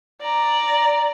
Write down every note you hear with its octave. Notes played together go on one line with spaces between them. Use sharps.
D5 A#5